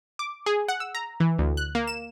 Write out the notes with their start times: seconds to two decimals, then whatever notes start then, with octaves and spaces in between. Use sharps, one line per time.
0.19 D6
0.46 G#4
0.68 F#5
0.80 E6
0.95 A#5
1.20 E3
1.39 D2
1.57 F#6
1.75 A#3
1.87 E7